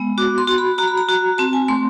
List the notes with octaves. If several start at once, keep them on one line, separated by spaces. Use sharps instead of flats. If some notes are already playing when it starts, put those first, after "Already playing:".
Already playing: G#3 B3
F#4 D6
C6
F#4
B5
F#4 A#5
B5
A#5
F#4
C4 A5
G#5
A3 C6